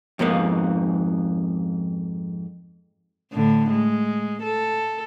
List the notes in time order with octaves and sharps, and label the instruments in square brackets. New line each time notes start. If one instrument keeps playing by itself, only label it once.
[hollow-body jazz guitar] F2 G#2 A#3 B3
[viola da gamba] A2 D3
G#3
A4